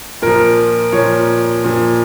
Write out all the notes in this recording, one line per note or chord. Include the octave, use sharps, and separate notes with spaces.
A#2 F3 A#4
A#2 F3 C#5
A#2 F3